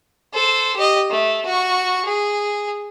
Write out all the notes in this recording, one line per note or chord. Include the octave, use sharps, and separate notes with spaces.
A4 C5
G4 D#5
A3
F#4 C#6
G#4